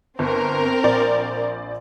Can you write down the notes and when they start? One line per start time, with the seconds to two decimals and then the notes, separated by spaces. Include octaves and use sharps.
0.19 G1 C4 A#4
0.84 A#1 C5 D5